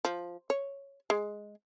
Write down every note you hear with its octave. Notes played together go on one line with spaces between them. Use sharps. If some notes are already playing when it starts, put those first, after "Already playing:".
F3
C#5
G#3